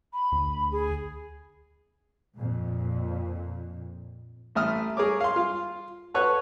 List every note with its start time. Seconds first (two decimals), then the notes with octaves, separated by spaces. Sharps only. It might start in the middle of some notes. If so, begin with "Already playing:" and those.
0.13 B5
0.32 D2
0.71 G#4
2.36 F2 A#2
4.55 A1 A3 E5 D#6 F6
4.97 G#4 A#4 C#5 D6
5.21 F5 C6
5.36 F4
6.14 F#4 A4 B4 C#5 C#6 F#6